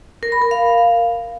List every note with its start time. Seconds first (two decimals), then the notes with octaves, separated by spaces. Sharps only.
0.23 A#4
0.32 B5
0.42 A#4
0.51 F5